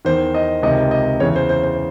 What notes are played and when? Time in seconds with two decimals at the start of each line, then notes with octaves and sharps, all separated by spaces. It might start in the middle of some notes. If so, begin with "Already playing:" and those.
0.05 E2 D#3 C5
0.34 D#5
0.62 C#2 C3 D#3 D#5
0.91 D#5
1.20 E2 C#3 E3 C#5
1.36 C5
1.49 C5
1.63 C5